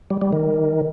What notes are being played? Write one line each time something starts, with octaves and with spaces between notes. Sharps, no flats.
G3
G3
D#3